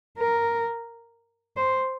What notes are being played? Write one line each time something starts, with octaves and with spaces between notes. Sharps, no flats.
A#4
C5